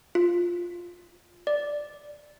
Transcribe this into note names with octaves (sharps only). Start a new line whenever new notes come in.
F4
D5